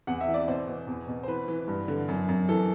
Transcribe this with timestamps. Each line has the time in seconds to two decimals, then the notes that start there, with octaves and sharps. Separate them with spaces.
0.07 E2 F#5
0.21 E5
0.28 E3
0.34 D5
0.48 B2 C5
0.67 B2
0.87 E2
1.08 B2
1.23 C5
1.28 E3 B4
1.48 E3
1.68 G2
1.88 D3
2.08 F#2
2.29 F#2
2.49 E3 A4